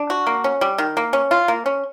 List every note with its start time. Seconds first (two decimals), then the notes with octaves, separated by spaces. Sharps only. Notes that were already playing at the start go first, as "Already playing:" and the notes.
Already playing: D4
0.10 F#4
0.27 A#3
0.44 C#4
0.61 G3
0.78 D#3
0.97 A#3
1.13 C#4
1.31 F4
1.48 A#3
1.66 C#4